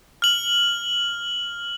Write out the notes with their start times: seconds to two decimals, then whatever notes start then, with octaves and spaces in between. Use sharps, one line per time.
0.22 F6 F#7